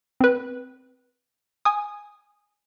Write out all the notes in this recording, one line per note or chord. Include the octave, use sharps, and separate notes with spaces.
C4 B4
G#5 D#6